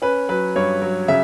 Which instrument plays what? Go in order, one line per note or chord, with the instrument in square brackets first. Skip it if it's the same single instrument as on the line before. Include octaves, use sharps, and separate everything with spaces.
[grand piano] C#4 B4
F#3 B4
G2 C#5
F#3
C#3 E5